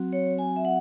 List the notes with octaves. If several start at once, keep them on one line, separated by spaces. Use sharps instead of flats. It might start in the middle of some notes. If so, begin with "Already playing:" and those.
Already playing: F#3 C4 F#4
C#5
G#5
E5
F#5